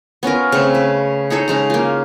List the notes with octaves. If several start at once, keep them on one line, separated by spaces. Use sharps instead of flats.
B3 C#4 F4 A#4
C#3 A3 C4
B4
D#4 G#4 A4 C#5
C#3 G#3 A#5
A#3 F4